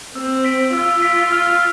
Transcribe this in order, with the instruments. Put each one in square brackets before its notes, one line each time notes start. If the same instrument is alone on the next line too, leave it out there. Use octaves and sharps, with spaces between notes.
[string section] C4 [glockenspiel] E6
[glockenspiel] B6 D7
[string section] F4 [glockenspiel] E6
[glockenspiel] B6 D7
F6